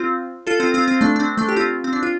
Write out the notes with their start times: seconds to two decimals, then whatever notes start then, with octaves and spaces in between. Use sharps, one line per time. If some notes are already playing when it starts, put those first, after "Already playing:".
Already playing: C4 F4
0.47 F4 A4
0.60 C4 F4
0.74 C4 F4
0.88 C4 F4
1.01 A3 D4
1.16 D4
1.20 C4
1.37 A3 D4
1.49 G4
1.56 C4 F4
1.84 C4
1.93 D4
2.03 F4